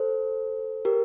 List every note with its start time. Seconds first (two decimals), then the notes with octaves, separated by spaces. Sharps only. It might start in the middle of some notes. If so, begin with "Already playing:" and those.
Already playing: A4 C5
0.85 G4 A#4